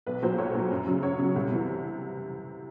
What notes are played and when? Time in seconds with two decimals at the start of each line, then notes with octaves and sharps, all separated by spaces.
0.06 B1 B4
0.23 A#2 F#3 C5
0.38 B1 C#5
0.55 A#2 F#3
0.71 F#2
0.87 C#3 F#3
1.03 F#2 C#5
1.19 C#3 F#3
1.36 C2
1.51 C3 E3